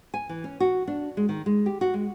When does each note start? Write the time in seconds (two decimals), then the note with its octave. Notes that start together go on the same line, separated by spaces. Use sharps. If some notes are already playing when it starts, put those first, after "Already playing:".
0.14 G#5
0.29 E3
0.44 C#4
0.60 F#4
0.88 D4
1.17 G#3
1.29 D#3
1.46 G#3
1.66 G4
1.81 F#4
1.94 G#3